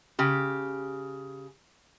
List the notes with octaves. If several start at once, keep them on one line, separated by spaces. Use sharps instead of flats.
C#3 G4